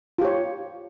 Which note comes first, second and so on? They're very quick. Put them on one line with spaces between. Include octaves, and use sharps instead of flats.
F4 G4 C#5